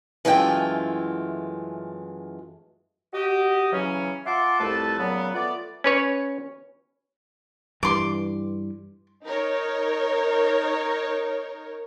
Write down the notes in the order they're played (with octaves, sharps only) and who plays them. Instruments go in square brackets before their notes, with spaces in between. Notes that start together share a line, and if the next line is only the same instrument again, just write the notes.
[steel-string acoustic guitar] F#2 E3 G#3 A3 F4 G5
[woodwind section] F#4 G4 D#5
C#3 E3 F#3 C#4
F4 E5 F#5 A5 C6 D6
C2 F2 A3 A4 B4 A5
A#2 C#3 F#3 B3
A3 B3 F4 D5
[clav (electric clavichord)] C#4 B4 C#5
[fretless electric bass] G2 E3 [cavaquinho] C6 D6
[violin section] D#4 A#4 C#5